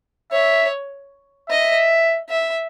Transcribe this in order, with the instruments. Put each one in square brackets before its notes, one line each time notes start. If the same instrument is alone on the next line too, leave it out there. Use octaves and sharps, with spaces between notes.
[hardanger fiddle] C#5 [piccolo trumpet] E5
[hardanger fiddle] D#5 [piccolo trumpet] E5
[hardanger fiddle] E5